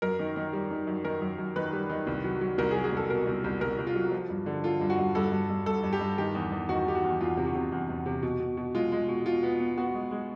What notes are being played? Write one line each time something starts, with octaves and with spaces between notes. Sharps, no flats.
F#2 A#4
D#3
D#3
G3
D#3
F#2
D#3 A#4
F#2
F#2
D#3 B4
G3
D#3
C2
F#3
F#3
C2 A#4
G#4
F#3
G#4
C2 A4
B2 A#4
C2
C2
C2 A#4
C2
F4
F#3
F3
G2
D3
D3 F4
G2
F#4
G2
G2 A4
G2
G2
G2 A4
G2
G4
G2
D#3 G4
E2
E2
D#3 F#4
D#3 G4
F#4
E2
E2 F4
C3
F#4
C3
E2
E2
C3
B2
B2
B2
G#3 F4
G#3
B2
B2 F4
B3
B3
B3 F#4
G#3
G#3